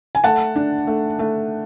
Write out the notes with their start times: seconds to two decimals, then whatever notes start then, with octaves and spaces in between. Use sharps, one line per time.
0.15 G#5
0.24 A3 F#5 A5
0.56 D4
0.87 A3
1.19 A3